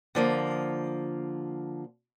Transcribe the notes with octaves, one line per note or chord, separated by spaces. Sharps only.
D3 F3 A#3